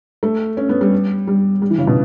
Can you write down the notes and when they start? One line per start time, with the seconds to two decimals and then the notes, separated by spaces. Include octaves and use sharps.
0.23 A3
0.57 C#4
0.69 B3
0.81 G3
1.27 G3
1.62 G3
1.70 E3
1.78 C#3
1.87 B2